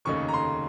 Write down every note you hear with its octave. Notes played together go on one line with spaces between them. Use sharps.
F1 D#2 C#3 A3 D#4 C#6
A#5
C6